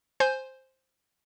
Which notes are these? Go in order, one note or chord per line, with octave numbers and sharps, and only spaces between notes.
C5 G#5 G6